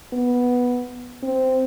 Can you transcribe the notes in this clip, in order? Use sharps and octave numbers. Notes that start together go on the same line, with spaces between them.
B3
C4